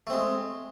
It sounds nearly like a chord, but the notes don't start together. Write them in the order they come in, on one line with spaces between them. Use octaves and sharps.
A3 C4 G#3